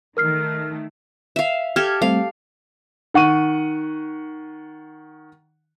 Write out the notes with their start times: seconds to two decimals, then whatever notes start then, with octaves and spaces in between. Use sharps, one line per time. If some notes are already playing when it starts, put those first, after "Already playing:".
0.17 D#3 A3 A#4 F6 C7
1.36 E5 F5
1.76 G4 A4 F6 G#6
2.02 G3 A3 C4 F5
3.14 D#3 F#5 C#6 D#7